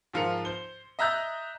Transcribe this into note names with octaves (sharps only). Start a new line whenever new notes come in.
G#2 F3 F4 A#4 C#7 F7
C5 G7
D#5 E5 A#5 F#6 G6 A6